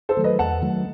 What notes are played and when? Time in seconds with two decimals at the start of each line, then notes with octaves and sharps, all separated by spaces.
0.09 A4 C5
0.17 D#3 F#3 A3
0.24 B4 D#5
0.39 E2 F#5 A5
0.62 D#3 F#3 A3